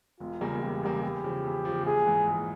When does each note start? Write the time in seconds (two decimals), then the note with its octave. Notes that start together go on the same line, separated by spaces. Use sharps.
0.20 E1 F4
0.41 E2 C#3 G3 A#3
0.62 E1 G4
0.82 E2 C#3 G3 A#3
1.03 E2 G4
1.24 C#3 F3
1.44 E2
1.65 C#3 F3
1.86 A#1 G#4
2.06 G#2 E3
2.27 A#1